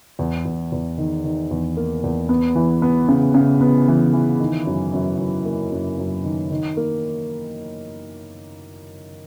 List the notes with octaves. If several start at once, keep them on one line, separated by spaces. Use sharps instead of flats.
E2
E2
E2
D#3
D#3
E2
A#3
E2
B3
E3
B3
C#3
C#3
B3
E3
E3
D#3
F#2
F#2
F#2
A#3
F#2
F#2
D#3
D#3
A#3